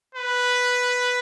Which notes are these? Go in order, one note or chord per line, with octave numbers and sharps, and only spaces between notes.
B4